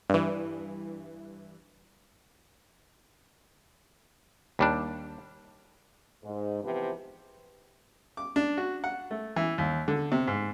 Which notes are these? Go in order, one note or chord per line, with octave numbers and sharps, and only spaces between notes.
G2 E3
D#2 G3 D4
G#2
C3 E3 F3 B3 G4 B4
D6
D4
F#4
F#5
A3
E3
D#2
D3
C3
G#2